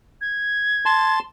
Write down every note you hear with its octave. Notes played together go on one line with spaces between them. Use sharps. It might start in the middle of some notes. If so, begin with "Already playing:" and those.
G#6
A5 C6